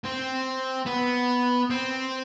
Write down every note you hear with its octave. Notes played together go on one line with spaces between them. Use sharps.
C4
B3
C4